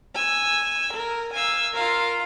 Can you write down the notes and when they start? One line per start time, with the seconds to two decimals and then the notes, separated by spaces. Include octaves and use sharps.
0.15 G#5 E6
0.94 A#4
1.34 F5 G#5 E6
1.74 F4 A#4 F5